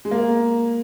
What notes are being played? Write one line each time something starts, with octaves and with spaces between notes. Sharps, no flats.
G#3
A#3